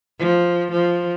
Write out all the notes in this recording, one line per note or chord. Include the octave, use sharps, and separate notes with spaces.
F3
F3